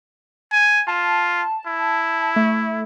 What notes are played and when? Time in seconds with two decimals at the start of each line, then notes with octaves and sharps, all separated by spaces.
0.52 G#5
0.88 F4 A5
1.67 E4
2.36 A3